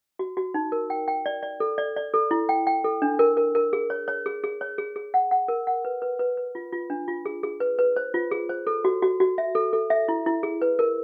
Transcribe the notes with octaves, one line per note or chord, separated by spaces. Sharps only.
F#4
F#4
D#4
A#4
G5
G5
D5
D5
A4
D5
D5
A4
E4
G5
G5
A4
D4
A#4
A#4
A#4
G#4
C#5
C#5
G#4
G#4
C#5
G#4
G#4
F#5
F#5
A#4
F#5
B4
B4
B4
B4
F4
F4
D4
F4
G#4
G#4
B4
B4
C5
F4
G#4
C5
A4
F#4
F#4
F#4
E5
A4
A4
E5
E4
E4
G#4
B4
A#4